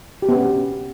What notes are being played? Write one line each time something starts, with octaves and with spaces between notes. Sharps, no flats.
G4
B3
C#4